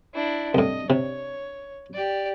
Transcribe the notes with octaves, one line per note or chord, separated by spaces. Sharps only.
D4 E4
C2 A2 D#5
C3 C#5
G4 D5